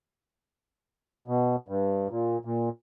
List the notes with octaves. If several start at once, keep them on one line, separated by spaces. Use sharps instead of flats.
B2
G2
A#2
A#2